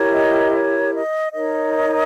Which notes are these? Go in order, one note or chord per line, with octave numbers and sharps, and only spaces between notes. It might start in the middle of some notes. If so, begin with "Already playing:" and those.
Already playing: E4 G4 A#4 C#5
D#5
C#5
D#5
D#4 A#4 C#5 D#5